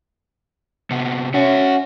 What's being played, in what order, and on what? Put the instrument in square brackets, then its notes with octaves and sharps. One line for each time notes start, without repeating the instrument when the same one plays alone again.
[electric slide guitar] C3 B3
[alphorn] C#4 [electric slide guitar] F#4 E5 F#5